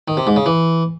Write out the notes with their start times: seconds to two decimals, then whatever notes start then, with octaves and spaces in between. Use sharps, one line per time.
0.08 D#3
0.17 C3
0.27 G#2
0.36 C#3
0.46 E3